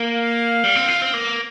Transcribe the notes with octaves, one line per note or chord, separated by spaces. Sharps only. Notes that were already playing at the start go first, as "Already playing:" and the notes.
Already playing: A#3
F5
G3
C4
F4
C4
A#3